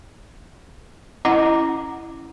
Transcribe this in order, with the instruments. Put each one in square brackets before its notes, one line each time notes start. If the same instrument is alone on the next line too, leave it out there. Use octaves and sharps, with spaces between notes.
[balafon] C#4 E4 D#5 F#5 A#5 D6